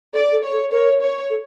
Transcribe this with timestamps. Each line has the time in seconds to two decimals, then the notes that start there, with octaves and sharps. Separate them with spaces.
0.13 A4 D5
0.32 A4
0.43 C#5
0.52 A4
0.71 A#4 C#5
1.01 C#5
1.30 A4